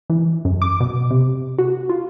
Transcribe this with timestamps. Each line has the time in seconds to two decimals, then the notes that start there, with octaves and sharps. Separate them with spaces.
0.10 E3
0.45 F#2
0.62 D6
0.80 B2
1.11 C3
1.59 F#4
1.89 F4